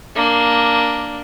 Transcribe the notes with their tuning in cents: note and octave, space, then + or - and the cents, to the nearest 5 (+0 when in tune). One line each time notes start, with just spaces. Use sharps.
A#3 +0 D4 +0